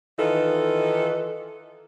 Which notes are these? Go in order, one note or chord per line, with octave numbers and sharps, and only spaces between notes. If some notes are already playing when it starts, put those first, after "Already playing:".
D#3 E3 D#4 F4 A4 B4